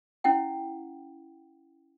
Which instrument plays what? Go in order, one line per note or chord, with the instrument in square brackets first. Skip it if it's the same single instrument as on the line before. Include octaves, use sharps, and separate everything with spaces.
[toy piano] C#4 E4 F#5 G5